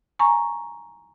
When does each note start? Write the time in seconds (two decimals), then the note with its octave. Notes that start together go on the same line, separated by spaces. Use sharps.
0.19 G#5 A#5 C#6